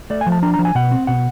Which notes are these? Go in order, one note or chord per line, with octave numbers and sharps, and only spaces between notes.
A3 D5
G#5
F3
A5
D4 A#5
A#5
F3
G#5
B2 F#5
C4
B2 F#5